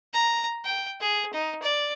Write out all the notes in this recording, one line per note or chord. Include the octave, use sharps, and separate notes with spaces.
A#5
G5
G#4
D#4
D5